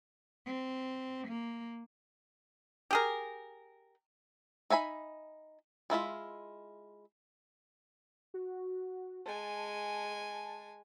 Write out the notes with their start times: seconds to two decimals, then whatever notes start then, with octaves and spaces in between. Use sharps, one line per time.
0.47 C4
1.28 A#3
2.91 G4 G#4 A#4
4.70 D#4 E5 G#5 B5
5.90 G#3 E4 F4 E5
8.34 F#4
9.26 G#3 G#5 A5